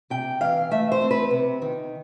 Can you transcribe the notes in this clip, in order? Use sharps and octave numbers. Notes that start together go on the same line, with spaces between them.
C3 G5
E3 F5
A3 E5
C5
C4
B4
C3
D#3